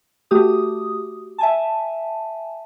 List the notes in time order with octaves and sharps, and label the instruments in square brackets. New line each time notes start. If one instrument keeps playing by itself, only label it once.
[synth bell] A3 F#4 G4 D#6
E5 G#5 A5